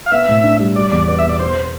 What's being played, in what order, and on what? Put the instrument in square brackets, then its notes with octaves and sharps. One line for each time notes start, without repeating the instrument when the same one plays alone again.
[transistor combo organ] F5
[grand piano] B3 [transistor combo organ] E5
[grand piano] A2
D4
G3
[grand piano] G3 [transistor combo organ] D5
[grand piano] E2 [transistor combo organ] D5
[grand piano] B3 [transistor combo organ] D5
[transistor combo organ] E5
[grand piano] B2
[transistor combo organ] D5
[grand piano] B3 [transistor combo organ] C5